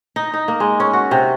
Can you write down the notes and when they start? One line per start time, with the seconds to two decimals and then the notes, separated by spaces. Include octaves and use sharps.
0.16 D#4
0.34 D#4
0.48 A#3
0.60 G#3
0.80 C#4
0.93 F#4
1.11 C3